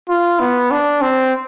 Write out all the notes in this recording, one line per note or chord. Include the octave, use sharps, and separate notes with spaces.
F4
B3
D4
C4